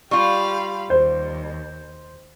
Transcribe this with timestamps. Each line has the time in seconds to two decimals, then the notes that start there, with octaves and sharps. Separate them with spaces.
0.11 G3 F4 G4 F5 B5 C#6
0.90 D#2 C5